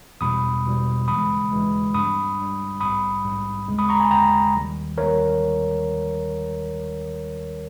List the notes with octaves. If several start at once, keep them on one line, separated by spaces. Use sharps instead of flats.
E2 B2 G3 B5 D#6
E2 B2 G3
D#2 C#3 E3 G#3 B5 D#6
D#2 C#3 E3 G#3
G2 G3 B5 D#6
G2 G3
A#1 G#2 G3 B5 D#6
A#1 G#2 G3
D#2 C#3 G#3
B5 D#6
A#5 C#6
G#5 B5
D#2 C#3 G#3 G5 A#5
D#2 D#3 G3
D#2 D#3 G3 A#4 C#5